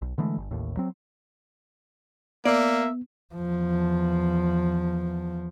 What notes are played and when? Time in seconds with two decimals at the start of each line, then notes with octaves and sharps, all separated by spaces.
0.02 B1
0.18 D3 E3 G#3 A3
0.38 G1
0.51 A1 D#2 A2
0.77 F#3 C4
2.45 A#3 B3 D5 E5
3.34 E2 F3